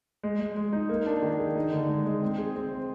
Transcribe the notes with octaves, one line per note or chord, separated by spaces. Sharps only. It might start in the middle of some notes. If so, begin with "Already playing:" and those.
G#3
G#3
G#3
D#4
A#3
D4
D#3
G#4
D#4
D3
G#3
G#3
C4
G#4
C4
C5